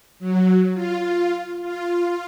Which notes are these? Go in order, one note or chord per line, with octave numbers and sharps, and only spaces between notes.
F#3
F4
F4